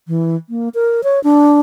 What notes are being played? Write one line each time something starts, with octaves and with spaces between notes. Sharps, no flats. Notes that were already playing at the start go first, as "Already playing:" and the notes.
E3
A#3
A#4
C#5
D4